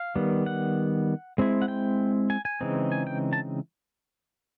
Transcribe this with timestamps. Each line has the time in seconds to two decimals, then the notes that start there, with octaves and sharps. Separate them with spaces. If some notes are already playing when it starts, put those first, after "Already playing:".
Already playing: F5
0.16 D#3 G3 B3
0.46 F#5
1.38 G#3 C4 E4
1.62 F#5
1.68 G5
2.30 G#5
2.45 G#5
2.61 C#3 E3 G#3 C4 D#4
2.92 G#5
3.07 G5
3.33 A5